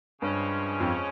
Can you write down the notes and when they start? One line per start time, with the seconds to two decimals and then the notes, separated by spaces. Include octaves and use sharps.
0.21 G2 C#3 F3 G#3 C#4
0.80 F2